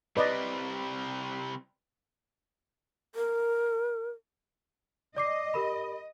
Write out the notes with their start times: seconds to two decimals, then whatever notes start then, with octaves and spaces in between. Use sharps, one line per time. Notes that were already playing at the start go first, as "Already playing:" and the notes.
0.17 C3 G3 B4 D5 D#5
3.15 A#4
5.16 D5 D#5 D6 C7
5.54 G4 A#4 B5